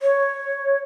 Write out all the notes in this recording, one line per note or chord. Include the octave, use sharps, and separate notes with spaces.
C#5